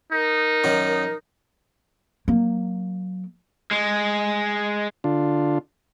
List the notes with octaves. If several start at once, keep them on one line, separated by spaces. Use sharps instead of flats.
D#4 A#4
F#2 D#3 F#3
F#3 A#3
G#3
D3 D4 F4